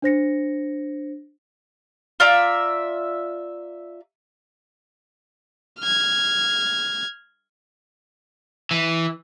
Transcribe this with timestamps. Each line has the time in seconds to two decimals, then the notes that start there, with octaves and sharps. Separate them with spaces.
0.02 D4 C5 A#6 C#7
2.20 F4 D5 E5 A#5
5.79 F6 G#6
8.71 E3